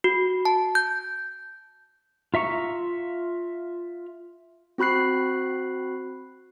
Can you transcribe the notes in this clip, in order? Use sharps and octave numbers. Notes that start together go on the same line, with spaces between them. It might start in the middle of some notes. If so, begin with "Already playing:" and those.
F#4
A5
G6
F4 E5 A#5 C#6
C4 F#4 B5 F#6 C7